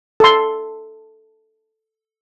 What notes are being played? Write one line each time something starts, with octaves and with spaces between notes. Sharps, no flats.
A4 C6